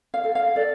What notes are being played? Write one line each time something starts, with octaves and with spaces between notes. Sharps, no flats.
F5
A4
F5
A4 D5